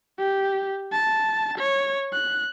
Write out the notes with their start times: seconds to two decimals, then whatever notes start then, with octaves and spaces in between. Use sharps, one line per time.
0.19 G4
0.92 A5
1.58 C#5
2.13 F#6